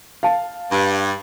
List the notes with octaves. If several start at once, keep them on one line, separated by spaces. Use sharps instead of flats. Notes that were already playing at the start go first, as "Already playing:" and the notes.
F5 A5
G2